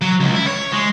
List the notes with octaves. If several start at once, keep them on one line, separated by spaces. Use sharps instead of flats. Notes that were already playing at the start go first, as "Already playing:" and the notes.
F#3
C#2
E4
C#5
G#3